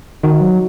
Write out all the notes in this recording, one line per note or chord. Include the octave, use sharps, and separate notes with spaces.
D#3 D#4 F#4
F#3